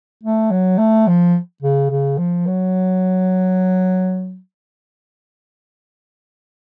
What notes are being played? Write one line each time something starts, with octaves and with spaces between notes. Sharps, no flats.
A3
F#3
A3
F3
C#3
C#3
F3
F#3